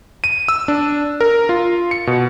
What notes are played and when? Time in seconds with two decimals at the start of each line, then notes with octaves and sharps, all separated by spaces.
0.24 D#7
0.48 E6
0.68 D4
1.21 A#4
1.49 F4
1.91 C#7
2.07 B2